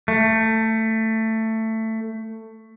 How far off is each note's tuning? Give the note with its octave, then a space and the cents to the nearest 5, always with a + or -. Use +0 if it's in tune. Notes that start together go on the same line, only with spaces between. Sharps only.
A3 +15